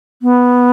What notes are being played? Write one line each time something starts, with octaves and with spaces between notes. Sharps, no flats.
B3